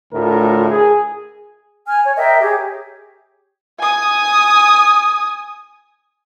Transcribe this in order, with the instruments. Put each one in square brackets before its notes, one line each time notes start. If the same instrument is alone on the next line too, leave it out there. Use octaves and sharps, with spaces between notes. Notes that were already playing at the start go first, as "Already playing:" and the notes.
[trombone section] D2 A2 A3 F4 A#4
G#4
[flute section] G#5 F6
C#5
A#4 D#5 E5 G5
G4 G#4 C#5
[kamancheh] G#5 D#6